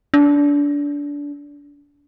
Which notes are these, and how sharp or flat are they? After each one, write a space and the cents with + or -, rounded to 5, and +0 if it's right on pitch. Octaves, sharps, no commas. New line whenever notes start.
D4 -25